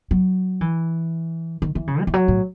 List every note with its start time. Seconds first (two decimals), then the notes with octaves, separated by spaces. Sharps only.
0.11 F#3
0.61 E3
1.62 D#3
1.75 E3
1.87 C#3
2.01 G#3
2.07 E3
2.14 F#3
2.28 A2